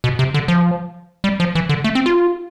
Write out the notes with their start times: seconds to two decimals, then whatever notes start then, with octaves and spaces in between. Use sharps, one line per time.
0.04 B2
0.19 C3
0.34 D3
0.48 F3
1.24 G3
1.40 F3
1.55 E3
1.69 D3
1.84 A3
1.95 C4
2.06 F4